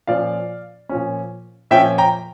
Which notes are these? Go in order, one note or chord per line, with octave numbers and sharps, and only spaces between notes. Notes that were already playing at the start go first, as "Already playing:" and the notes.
A#2 F3 C#4 D5 F5
A#2 F3 C#4
A#2 F3 C#4 E5 G5
G5 A#5